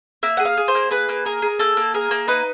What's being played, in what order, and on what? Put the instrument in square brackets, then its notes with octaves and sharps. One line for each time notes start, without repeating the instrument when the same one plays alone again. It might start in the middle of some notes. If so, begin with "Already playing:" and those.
[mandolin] A#3 E5
G#4 F#5
F5
G#4
C5
A#3
G#4 B4
A#3
G#4 A#4
G#4
A#3 A4
A#3
G#4 A#4
A#3
D#4 B4